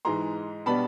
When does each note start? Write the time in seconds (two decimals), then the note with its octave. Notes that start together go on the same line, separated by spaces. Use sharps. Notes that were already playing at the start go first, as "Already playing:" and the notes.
0.05 G#2 E3 G#3 A#5 C6
0.66 B2 G3 B3 D4 A5 B5